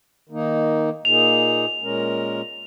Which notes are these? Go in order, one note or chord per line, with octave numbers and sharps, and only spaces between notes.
D#3 A#3 D#4
A#2 A#3 D#4 G#4 F7
A#2 G#3 C#4 A#4